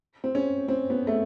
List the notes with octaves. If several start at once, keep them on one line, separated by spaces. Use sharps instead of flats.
C4
C#4
C4
B3
A3